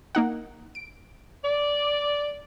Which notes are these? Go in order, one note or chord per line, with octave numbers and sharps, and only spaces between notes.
A#3 D#4 F#5
D7
D5